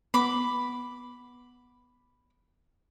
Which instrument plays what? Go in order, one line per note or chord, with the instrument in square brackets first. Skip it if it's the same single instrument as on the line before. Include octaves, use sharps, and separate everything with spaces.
[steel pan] B3 [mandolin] B5 D6